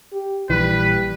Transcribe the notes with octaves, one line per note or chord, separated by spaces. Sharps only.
G4
A#1 E3 G3 B4